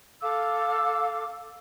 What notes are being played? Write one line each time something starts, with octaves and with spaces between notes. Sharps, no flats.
A4 F5 D6 E6